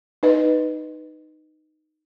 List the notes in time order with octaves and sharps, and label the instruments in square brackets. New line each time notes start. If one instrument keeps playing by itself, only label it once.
[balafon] D#4 B4 D#5